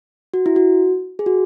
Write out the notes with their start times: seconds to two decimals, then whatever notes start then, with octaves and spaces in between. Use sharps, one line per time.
0.34 F#4
0.46 E4
0.56 F#4
1.19 G#4
1.26 F#4